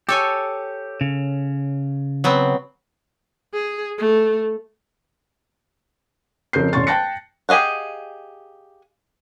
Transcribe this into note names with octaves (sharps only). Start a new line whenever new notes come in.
G4 A4 C#5 G#5
C#3
F#3 B3 C4
G#4
A3
F2 C#3 A#4 G6 C7
E1 C#4 C6 C#6 A6
G5 A5 F#6 A6 A#6 C#7
G4 G#4 D#5 F5 F#5